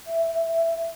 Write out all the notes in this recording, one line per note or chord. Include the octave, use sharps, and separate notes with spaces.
E5
E5
E5
E5